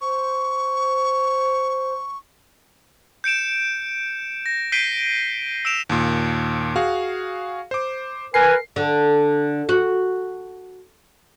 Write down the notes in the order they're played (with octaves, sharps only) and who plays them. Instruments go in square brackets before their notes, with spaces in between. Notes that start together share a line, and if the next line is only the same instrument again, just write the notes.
[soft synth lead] C5 [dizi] C#6
[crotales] G6 C#7 D7 E7
A#6
G6 B6 C7 D7 D#7 G7
E6 D7 E7 F7
[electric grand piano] D#2 A#2
F#4 G#4 F5
C5 D6
[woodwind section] A#4 B4 G#5 [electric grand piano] C7
[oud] D3
F#4